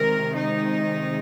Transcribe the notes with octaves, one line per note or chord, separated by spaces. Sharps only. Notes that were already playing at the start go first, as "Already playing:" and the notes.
Already playing: C3 D#3 G#3 A#4
D#4